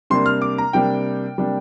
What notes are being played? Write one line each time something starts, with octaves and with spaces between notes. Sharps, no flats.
C3 G3 A#3 D4 C6
F6
D6
A#5
C3 G3 A#3 D4 G5
C3 G3 A#3 D4